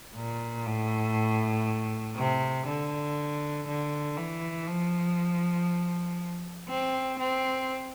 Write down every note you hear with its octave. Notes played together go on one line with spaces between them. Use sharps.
A#2
A2
C3
D3
D3
E3
F3
C4
C4